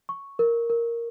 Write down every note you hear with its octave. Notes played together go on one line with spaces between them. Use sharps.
C#6
A#4
A#4